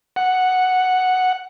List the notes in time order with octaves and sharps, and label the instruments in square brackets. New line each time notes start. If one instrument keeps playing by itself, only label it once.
[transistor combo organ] F#5